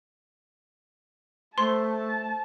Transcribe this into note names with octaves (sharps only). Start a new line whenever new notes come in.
A3 C5 A5 C6